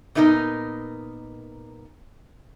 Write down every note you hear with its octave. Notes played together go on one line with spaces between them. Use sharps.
A#2 B3 D#4 A#4 D#5